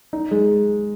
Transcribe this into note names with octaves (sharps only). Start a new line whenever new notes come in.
D#4
G#3